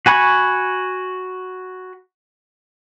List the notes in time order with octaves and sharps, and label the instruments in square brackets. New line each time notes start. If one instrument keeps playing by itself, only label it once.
[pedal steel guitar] F#4 G#5 B5 C#6